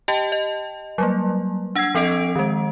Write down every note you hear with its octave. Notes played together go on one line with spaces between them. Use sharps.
G4 D#5 G5 A5
D#5
F#3 G3 A#3
D4 F#5 E6 G#6 C7
F3 C4 A4 D#5 D7
D#3 G#3